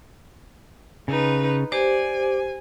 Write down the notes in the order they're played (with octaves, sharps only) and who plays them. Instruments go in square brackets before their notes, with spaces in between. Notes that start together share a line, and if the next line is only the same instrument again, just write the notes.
[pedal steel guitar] C#3 [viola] D#4 B4
[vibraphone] G4 C5 [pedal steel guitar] D5 [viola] G#5